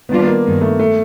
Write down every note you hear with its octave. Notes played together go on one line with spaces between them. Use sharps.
D#3 G3 A#3 B3 D4 F4
A#3
G2 D#3 G#3
A3
A3